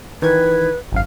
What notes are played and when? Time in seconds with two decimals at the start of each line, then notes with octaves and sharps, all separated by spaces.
0.22 D#3 E3 B4 G#6
0.92 G#1 F#2 F5